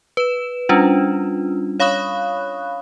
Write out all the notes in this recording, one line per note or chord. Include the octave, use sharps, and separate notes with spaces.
B4 E7
G3 C#4 D4 F4
C#5 F5 B5 C#6 D#6 F#6